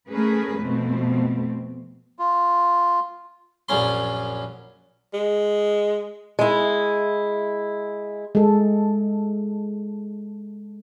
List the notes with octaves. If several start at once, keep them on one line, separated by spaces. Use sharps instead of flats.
A3 C#4 G#4 A#4 B4
F2 B2 A3 C4
F4
A#1 F#2 A#2 C#4 C6
G#3
G#3 E4
G#3 A4